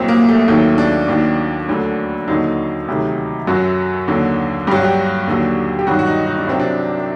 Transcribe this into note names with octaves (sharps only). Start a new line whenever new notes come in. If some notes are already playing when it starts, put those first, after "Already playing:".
Already playing: C2 A#2 F#3 C4
A#3
A3
D#2 D#3 F#3 A3
D4
D#2 D#3 F#3
D2 D3 F#3
D#2 D3 F#3 D#4
D2 C3 D#3 F#3
F#2 F#3 F#4
D#2 D3 F#3
G2 F#3 F#4 G4
G4
D#2 D3 F#3
G4
G2 D#3 F#3 F#4
F#4
D#4
D#4
D4
C2 C3 F#3 C4
D4